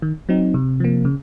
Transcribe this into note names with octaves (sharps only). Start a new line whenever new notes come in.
D#3
F#3 C4 D#4
C3
F3 A#3
C#3